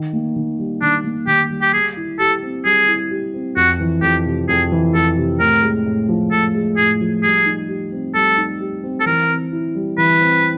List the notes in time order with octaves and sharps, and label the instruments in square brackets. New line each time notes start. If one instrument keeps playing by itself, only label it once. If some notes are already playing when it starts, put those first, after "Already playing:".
Already playing: [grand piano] D#3
A#3
D#3
G3
[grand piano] D#3 [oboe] D4
[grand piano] A#3
[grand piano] D#3 [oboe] G4
[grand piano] G3
[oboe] G4
[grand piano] G3 [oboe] G#4
[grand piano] E4
[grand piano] G4 [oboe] A4
[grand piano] C4
[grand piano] G3 [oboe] G#4
[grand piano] E4
G4
C4
[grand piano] F2 [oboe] F#4
[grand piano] E3
[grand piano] F2 [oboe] G4
[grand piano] C3
[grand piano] F2 [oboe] G#4
[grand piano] E3
[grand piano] F2 [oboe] A4
[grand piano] C3
[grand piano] A2 [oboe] A#4
[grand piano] G#3
A2
F3
[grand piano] A2 [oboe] A4
[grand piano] G#3
[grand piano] A2 [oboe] G#4
[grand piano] F3
[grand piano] G3 [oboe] G#4
[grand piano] D#4
G4
C4
[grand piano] G3 [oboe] A4
[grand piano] D#4
G4
C4
[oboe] A4
[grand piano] E3 [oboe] A#4
[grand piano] C4
E4
G3
[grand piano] E3 [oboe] B4
[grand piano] C4